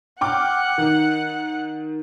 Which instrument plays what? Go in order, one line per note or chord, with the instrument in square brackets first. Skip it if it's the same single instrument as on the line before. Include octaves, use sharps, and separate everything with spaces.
[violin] F#5 [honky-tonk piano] G5 D6 F6
[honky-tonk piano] D#3